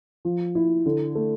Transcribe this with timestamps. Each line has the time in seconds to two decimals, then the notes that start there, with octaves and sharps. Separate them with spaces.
0.25 F3
0.55 E4
0.86 D3
1.15 A3